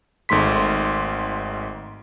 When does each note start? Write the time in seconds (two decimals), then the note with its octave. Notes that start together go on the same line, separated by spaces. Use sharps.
0.29 G#1 G#2 A3 C6 B6